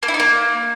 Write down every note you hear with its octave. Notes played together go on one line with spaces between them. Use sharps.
A#3
E4
D#4
A#3